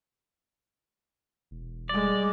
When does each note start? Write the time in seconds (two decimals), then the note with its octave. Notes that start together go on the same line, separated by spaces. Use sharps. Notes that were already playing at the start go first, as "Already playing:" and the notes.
1.51 E1
1.89 G3 G#3 D5